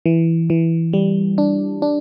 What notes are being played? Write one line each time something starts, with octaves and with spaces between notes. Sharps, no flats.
E3
E3
G3
D4
D4